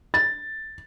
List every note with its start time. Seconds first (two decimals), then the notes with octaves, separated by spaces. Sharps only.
0.14 A6